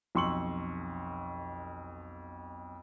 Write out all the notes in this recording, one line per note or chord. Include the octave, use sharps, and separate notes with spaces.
B1 F2 C6 C#6 E6 F#7